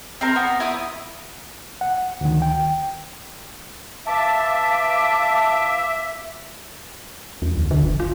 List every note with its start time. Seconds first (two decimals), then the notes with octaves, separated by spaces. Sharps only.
0.21 C4 E4 A#4 A#5
0.36 B3
0.60 E4 B5 D#6
1.81 F#5
2.21 D2 D#3
2.42 G5
4.06 E3 E5 F5 A5 D6
7.42 E2
7.57 D2
7.71 D3
7.83 F#1
8.00 F4